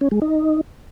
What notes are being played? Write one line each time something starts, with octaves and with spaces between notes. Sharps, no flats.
C#4
G#3
D#4